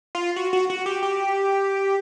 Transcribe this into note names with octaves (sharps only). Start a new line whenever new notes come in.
F4
F#4
F#4
F#4
G4
G4